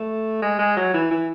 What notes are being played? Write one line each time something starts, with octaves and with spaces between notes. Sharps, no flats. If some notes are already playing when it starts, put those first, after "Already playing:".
Already playing: A3
G#3
G#3
F#3
E3
E3